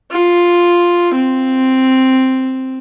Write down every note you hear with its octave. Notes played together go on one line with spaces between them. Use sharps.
F4
C4